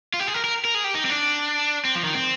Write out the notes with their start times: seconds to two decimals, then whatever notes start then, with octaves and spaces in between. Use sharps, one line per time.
0.14 F4
0.20 G4
0.27 G#4
0.34 A#4
0.44 A#4
0.65 A#4
0.75 G#4
0.84 G4
0.95 D#4
1.05 C4
1.10 D4
1.85 C4
1.95 F3
2.04 D#3
2.14 C4